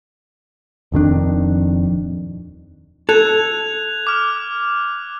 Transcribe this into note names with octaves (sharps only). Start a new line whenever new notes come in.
D#1 F2 D#3 D4
A4 F#6 G#6 F7
D6 F6